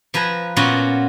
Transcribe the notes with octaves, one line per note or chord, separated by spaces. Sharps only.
F3 B4 G#5 A#5
A#2 B3 C#4 F4 F#4